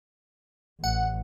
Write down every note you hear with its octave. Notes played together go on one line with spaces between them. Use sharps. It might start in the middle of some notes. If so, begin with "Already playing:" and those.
A1 F#5